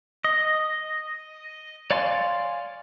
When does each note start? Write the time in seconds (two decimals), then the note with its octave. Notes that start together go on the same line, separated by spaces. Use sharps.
0.24 D#5
1.91 C#5 D5 F5 G#5 C6